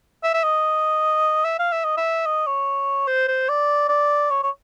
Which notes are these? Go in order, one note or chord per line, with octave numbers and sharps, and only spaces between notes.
E5
E5
D#5
E5
F5
E5
D#5
E5
D#5
C#5
C5
C5
D5
D5
C#5
C#5